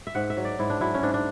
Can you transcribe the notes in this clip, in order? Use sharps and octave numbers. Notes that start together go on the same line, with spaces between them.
E5
G#2 F#5
E5
F#3
D5
G#2 E4
D4
F#3 E4
C#4
G#2 D4
D4